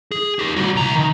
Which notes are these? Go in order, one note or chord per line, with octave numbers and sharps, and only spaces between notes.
G#4
D#4 G4
G3 F#4
C2 A#5
D#3